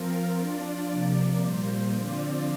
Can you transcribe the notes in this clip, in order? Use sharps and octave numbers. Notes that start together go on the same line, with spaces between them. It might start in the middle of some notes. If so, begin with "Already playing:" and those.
Already playing: F3 C4 F4 A#4
F3 D4 F4 D5
C3 F3 A#3 D5
A#2 G3 A#3 C5
D3 F3 C4 F4 D5